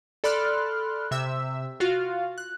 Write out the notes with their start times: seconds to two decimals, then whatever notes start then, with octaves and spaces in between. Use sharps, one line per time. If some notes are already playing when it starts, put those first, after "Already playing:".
0.24 A4 D5 B5 C6 F6 F#6
1.11 C3 E5 E6
1.80 F4 F#4 F5
2.38 F#6